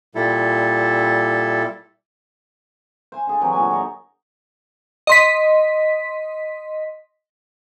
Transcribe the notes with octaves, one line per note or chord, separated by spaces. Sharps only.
A#2 G3 E4 A4
C5 G#5
D3 G#4 A5
C3 E3 F#3
A#2 D3 G#5
D5 D#5 A#5 C#6
D#5 C6 B6